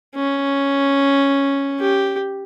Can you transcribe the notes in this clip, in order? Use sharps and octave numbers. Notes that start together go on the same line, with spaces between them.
C#4
G4